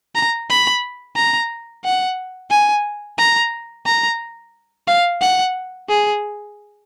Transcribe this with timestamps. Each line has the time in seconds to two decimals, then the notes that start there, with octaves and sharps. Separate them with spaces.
0.15 A#5
0.50 B5
1.16 A#5
1.85 F#5
2.51 G#5
3.18 A#5
3.86 A#5
4.87 F5
5.21 F#5
5.89 G#4